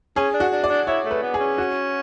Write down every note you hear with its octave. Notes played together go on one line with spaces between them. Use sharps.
C#4 G#4
D4
F#4
D4
D5
D4
E4 C#5
A3
B4
B3
G#4
C#4
F#4